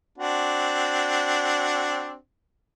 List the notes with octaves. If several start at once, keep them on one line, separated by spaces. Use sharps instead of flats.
C4 D4 F#4